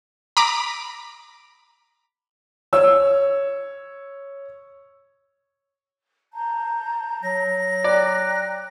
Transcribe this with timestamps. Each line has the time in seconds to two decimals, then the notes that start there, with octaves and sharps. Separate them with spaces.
0.37 A#5 B5 D6
2.73 C#5 E6
6.33 A5 A#5 G6
7.23 F#3 A#6
7.84 D5 G5 A#5 F#6